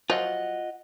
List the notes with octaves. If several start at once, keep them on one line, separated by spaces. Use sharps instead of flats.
F3 F#3 F4 D#5 F#5